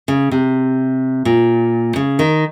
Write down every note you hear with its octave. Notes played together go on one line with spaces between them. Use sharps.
C#3
C3
A#2
C#3
D#3